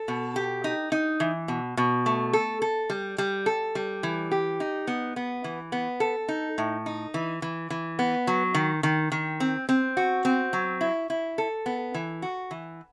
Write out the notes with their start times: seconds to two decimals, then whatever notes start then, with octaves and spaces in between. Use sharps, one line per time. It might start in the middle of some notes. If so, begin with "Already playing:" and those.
Already playing: A4
0.08 B2
0.36 G4
0.64 D#4
0.92 D#4
1.20 E3
1.48 B2
1.77 B2
2.06 A3
2.33 A4
2.62 A4
2.90 G3
3.18 G3
3.46 A4
3.75 G3
4.03 E3
4.31 G4
4.60 D#4
4.87 B3
5.16 B3
5.44 E3
5.72 B3
6.00 A4
6.28 D#4
6.58 A2
6.86 D#4
7.14 E3
7.42 E3
7.70 E3
7.99 B3
8.27 F#3
8.54 D#3
8.83 D#3
9.12 D#3
9.40 C4
9.69 C4
9.97 F#4
10.25 C4
10.53 F#3
10.81 E4
11.10 E4
11.38 A4
11.66 B3
11.94 E3
12.22 F#4
12.51 E3